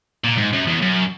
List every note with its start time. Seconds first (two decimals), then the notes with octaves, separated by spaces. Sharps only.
0.24 A#2
0.38 G#2
0.53 F#2
0.67 E2
0.83 F#2